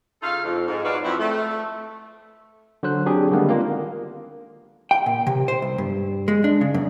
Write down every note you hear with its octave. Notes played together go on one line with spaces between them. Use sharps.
C#3 D#4 F4 A4 F5
F2
G#2
F#3 F#4 B4 C#5 D5 F5
F2 E4 F#4
A3
D3 F#3 C5 F#6
F#3 C4 D4 G4 G#4
D3 D#3 G3 G#3 A#3 B3
A#3 C4 F4 A#4 F5
G5
A#2
C3
C5
C2
G2
G#3
D4
C#3
F#2